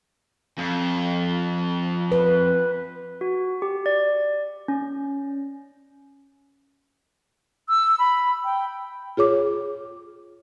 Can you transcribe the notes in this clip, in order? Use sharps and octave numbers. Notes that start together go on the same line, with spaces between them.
F2
B4
F#4
G4
D5
C#4
E6
B5
G5
F4 G#4 C#5 D6